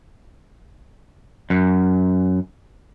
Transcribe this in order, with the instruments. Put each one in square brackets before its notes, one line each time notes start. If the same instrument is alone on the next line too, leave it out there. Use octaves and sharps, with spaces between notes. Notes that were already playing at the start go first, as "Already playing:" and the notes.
[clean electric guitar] F#2